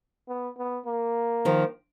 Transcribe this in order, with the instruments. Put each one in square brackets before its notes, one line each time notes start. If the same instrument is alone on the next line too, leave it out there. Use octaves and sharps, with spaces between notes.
[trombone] B3
B3
A#3
[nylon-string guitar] D#3 F3